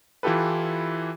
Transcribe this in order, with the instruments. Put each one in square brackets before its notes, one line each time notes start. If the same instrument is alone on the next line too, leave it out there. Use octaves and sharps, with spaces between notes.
[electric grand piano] E3 E4 F4 G4 A4 B4